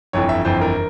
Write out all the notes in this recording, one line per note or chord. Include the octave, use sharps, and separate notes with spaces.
G1 F2 E3 C#5
E5
G1 F2 E3 C5
A#4